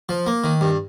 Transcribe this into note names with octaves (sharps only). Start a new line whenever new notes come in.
F3
A#3
D#3
G2